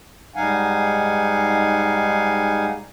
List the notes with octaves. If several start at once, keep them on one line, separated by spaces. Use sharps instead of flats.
G#2 G3 D#4 F5 F#5 G#5